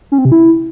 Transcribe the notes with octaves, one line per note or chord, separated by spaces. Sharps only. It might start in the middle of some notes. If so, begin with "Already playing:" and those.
C#4
C4
C3
E4